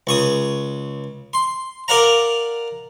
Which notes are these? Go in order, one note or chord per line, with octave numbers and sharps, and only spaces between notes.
C#2 C#6 D#6
C6
A#4 D5 F5 F#5 A#5